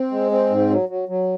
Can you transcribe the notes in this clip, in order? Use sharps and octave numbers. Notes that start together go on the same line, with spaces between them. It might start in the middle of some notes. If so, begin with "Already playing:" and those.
Already playing: C4
G#3
C4
G#2
F#3
F#3
F#3